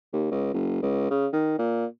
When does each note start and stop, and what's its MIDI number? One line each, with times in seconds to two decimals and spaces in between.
0.13 0.31 39
0.31 0.50 37
0.54 0.82 30
0.82 1.10 37
1.10 1.27 49
1.33 1.59 51
1.59 1.85 46